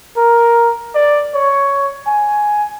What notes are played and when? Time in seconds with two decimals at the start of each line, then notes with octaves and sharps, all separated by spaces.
0.16 A#4
0.93 D5
1.34 C#5
2.06 G#5